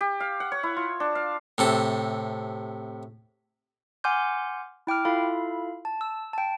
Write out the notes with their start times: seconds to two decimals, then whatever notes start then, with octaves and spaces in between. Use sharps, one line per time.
0.01 G4
0.20 F5
0.40 F#5
0.52 C#5
0.63 E4
0.76 F4
1.00 D4
1.15 F5
1.58 A2 C3 A4
4.04 F#5 G#5 C6 D6 F6 G6
4.87 E4 G5 D6 F6
5.05 E4 F4 A4 F5 B5
5.85 A5
6.01 E6
6.33 G5 A5